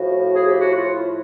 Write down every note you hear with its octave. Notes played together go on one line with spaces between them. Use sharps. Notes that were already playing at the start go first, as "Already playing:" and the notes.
Already playing: A2 F3 F#4
G#4
G4
F#4
F4
E4